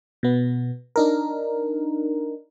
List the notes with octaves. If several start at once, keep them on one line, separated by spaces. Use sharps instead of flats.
B2 B3
D4 D#4 A#4